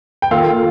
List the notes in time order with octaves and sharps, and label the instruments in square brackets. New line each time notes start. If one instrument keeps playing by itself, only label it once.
[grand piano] G5
[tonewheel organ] D#3 A#3 F4 A4 [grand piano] F5